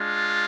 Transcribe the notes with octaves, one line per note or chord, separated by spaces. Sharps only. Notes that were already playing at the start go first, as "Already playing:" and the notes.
Already playing: G#3 D4 F4